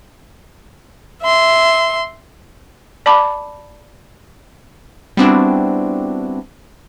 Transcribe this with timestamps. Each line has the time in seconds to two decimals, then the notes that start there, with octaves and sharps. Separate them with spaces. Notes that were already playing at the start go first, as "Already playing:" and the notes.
1.22 E5 C6
3.06 D5 A5 B5 D6
5.17 G3 B3 C4 D4 E4 F#4